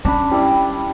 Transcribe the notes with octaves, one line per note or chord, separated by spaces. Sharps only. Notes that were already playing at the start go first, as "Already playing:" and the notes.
C#4 D4 B5
G3 E4 D5